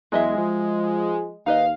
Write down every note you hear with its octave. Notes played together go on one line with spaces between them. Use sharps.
E2 F#3 G#3 D#5 E5
F3
D#2 D#4 B4 D#5 F5